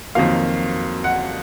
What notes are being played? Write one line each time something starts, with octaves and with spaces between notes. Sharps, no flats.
F2 D#3 F#3 A#3 F5
F#5